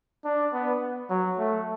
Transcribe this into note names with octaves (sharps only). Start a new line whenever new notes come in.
D4
B3
F#3
A3